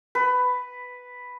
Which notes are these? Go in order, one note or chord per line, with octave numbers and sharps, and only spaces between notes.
B4